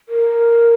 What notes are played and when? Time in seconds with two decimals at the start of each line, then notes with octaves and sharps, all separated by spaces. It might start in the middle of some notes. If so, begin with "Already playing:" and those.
0.09 A#4